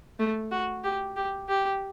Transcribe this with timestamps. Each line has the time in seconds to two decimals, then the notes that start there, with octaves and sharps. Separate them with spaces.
0.19 A3
0.51 F#4
0.84 G4
1.16 G4
1.48 G4